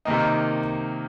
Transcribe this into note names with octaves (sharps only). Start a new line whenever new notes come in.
C3 D#3 A#3 D#4